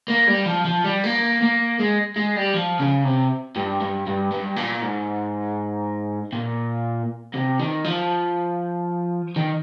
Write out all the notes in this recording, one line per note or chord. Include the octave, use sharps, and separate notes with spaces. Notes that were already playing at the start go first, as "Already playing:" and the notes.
A#3
G3
F3
F3
G3
A#3
A#3
G#3
G#3
G3
F3
C#3
C3
G2
G2
G2
G2
A#2
G#2
A#2
C3
D#3
F3
D#3